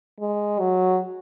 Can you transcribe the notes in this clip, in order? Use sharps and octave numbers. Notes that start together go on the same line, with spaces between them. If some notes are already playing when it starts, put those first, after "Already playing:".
G#3
F#3